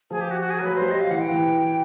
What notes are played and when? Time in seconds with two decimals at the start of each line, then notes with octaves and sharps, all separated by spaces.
0.10 F3 G#4
0.21 G4
0.31 F#4
0.41 F#4
0.50 G#4
0.59 F#3 A#4
0.64 B4
0.70 F#3
0.77 G3 C5
0.91 D#5
1.01 F5
1.10 E3 F#5
1.21 G5
1.31 E3